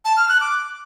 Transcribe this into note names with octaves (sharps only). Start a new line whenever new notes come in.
A5
F6
F#6
D6